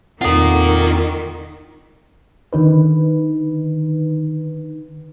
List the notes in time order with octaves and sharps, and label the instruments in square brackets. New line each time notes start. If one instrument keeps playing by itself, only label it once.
[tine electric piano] E2 C4 [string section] D#3 [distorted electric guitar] F4 A#4 [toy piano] A4 F#5
[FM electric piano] D3 D#3 D#4 B4